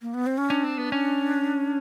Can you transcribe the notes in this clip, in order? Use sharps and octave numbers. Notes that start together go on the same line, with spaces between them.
A#3
B3
C4
C#4
C#4 D4
C4
B3
C#4